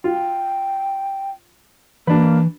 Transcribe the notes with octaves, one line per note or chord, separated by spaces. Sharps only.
F4 G5
E3 A#3 D4 B4